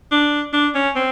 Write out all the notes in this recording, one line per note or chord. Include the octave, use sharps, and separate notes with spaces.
D4
D4
C#4
C4